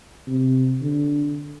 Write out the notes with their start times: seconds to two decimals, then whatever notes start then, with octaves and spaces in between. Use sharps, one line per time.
0.28 C3
0.81 D3